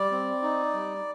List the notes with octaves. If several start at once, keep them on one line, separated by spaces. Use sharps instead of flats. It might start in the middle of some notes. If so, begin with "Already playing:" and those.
Already playing: G3 D5
C4
D#4
G3